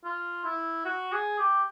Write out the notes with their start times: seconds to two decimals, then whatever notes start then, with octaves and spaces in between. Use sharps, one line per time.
0.05 F4
0.45 E4
0.85 F#4
1.12 G#4
1.39 G4